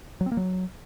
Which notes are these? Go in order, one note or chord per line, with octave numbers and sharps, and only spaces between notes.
F#3
C4
A#3
F#3